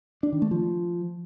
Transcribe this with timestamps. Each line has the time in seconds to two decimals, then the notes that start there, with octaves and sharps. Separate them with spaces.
0.23 D4
0.32 D#3
0.42 A3
0.51 F3